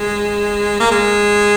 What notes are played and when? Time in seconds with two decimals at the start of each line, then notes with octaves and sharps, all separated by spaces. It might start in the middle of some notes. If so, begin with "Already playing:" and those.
Already playing: G#3
0.80 A#3
0.91 G#3